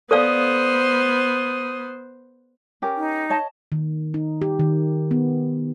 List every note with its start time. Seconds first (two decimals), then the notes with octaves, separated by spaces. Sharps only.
0.11 B3 A4 C5 D5 F5 D#6
2.82 C#4 G4 A#4
2.96 D#4
3.30 C#5 D#5 A5
3.72 D#3
4.14 D#4
4.42 G4
4.59 D#3
5.11 B3